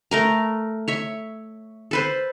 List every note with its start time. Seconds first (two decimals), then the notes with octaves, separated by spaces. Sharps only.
0.11 A3 A#4 A#5
0.88 C#5 E5
1.91 A4 B4 C5